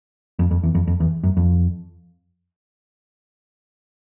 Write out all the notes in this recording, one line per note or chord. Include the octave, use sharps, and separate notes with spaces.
F2
F2
E2
F2
F2
E2
F#2
F2